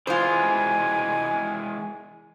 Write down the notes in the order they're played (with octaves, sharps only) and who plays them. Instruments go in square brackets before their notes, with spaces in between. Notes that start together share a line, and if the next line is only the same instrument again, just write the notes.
[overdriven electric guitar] E3 G#3 [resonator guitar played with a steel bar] F4 C5 [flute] G#5